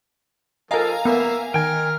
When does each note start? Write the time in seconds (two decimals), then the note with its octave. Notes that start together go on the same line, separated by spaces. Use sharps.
0.71 F3 A4 A#4 D#5 F5 G#5 A#5
1.05 A#3 B3 E5
1.54 D#3 A#4 G5 G#5 F6